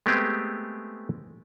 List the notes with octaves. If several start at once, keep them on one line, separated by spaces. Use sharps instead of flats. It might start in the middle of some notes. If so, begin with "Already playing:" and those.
G#3 A3 B3 C4 G4 G#4